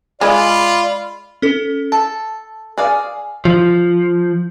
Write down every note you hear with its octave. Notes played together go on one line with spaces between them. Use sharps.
G#3 F4 D5 B5
C#4 A4
A4 A5
G#4 D5 F5
F3